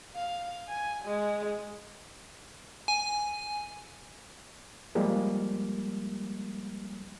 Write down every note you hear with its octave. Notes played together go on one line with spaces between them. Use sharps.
F5
G#5
G#3
G#5
F3 G3 G#3 A#3